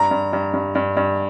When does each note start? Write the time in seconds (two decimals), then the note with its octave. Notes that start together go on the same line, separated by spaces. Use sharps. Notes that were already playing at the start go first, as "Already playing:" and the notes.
Already playing: G2 A#5
0.11 G2
0.33 G2
0.54 G2
0.75 G2
0.97 G2